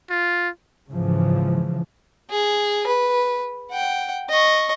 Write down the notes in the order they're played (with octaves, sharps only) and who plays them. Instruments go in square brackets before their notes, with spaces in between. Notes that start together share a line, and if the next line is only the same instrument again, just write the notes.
[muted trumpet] F4
[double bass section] G#2 C#3 E3 F3
[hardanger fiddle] G#4
B4
F#5 G5
D#5 C#6